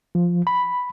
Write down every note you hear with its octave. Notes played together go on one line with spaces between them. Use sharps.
F3
B5